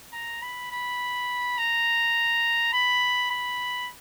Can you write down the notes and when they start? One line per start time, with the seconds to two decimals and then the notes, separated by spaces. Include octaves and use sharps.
0.13 A#5
0.43 B5
0.72 B5
1.58 A#5
2.73 B5
3.31 B5